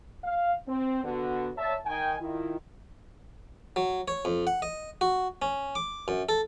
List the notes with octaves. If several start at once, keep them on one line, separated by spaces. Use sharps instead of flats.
F5
C4
D3 B3 F#4
A#2 C#5 E5 A5
D#3 G5 G#5
D#3 E4 F4
F#3
C#5
F2
F#5
D#5
F#4
C#4
D6
F#2
A4